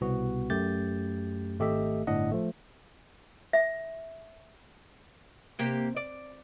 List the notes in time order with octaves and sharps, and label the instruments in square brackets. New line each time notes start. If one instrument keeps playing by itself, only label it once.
[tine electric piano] C2 B2 B3 F#4
F#2 A3 G4 G6 A6
G#1 A3 G4 A4 D#5 E5
G1 A2 D4 D#5 F#5
F3 A3
[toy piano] E5
[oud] C3 A#3 G4
D5